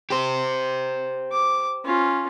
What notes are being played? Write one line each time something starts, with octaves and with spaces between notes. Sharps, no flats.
G4 C5
D6
C#4 F4